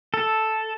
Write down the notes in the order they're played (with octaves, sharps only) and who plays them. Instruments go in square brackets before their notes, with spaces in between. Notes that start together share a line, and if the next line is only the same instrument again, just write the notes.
[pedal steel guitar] A4